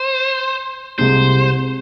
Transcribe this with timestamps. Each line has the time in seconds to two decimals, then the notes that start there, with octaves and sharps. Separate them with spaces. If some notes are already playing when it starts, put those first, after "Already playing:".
Already playing: C5
0.98 C2 C3 G#3 C5